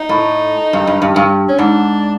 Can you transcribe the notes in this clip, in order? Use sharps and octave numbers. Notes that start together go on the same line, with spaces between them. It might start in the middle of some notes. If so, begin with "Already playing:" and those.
Already playing: D#4
A2
G2
G2
G2
G2
C#4
G#2 D4